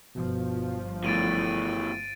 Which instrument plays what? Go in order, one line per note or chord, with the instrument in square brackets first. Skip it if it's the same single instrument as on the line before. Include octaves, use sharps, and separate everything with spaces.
[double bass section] G1 F3 [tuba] B2
[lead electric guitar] E2 A2 [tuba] A3 [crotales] A6 D7 D#7